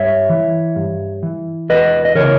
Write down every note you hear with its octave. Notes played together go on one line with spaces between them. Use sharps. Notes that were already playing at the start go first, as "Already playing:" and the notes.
Already playing: G2 C#5 E5
E3
G2
E3
E2 B4 D#5
D#5
C#3 E3 A#4 C#5